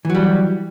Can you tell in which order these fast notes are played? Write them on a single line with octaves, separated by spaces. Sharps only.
E3 F#3 G3